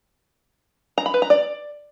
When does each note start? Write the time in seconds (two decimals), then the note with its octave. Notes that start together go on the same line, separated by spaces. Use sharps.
0.98 A#5
1.06 B5
1.14 B4
1.22 A#5
1.30 D5